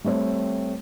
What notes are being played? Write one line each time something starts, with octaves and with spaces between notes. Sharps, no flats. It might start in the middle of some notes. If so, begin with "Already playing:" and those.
G3 A3 C4 C5 C#5